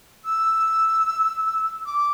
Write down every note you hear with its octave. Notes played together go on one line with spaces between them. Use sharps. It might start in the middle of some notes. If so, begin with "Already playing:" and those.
E6
D6